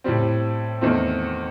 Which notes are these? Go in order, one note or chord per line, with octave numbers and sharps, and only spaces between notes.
A2 G3 C4
E2 D#3 A3 C4